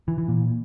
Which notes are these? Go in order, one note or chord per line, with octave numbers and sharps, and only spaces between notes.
E3
E3
A#2